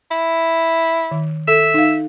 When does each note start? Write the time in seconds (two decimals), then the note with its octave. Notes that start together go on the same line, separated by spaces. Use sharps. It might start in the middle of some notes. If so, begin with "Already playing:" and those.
0.11 E4
1.11 D#3
1.48 A4 E5
1.74 D#4 F5